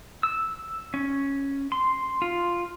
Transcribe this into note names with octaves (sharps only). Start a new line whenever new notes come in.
E6
C#4
C6
F4